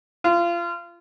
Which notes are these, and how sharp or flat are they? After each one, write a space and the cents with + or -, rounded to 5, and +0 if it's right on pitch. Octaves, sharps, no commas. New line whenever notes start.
F4 -25